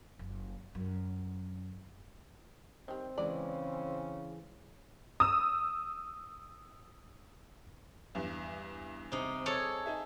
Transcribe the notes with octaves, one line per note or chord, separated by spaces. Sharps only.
F#1
F#2
D#3 G3 C4
C#3 E3 G#3 D5
D#6 E6
E2 G2
C3 D#4
G#4 A4 C#5
D#4 G#4 E5